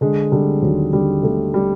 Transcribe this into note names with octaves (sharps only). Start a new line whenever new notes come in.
D3 G#3
D3 G3
D#2 F#3
D3 G3
D3 A3
G3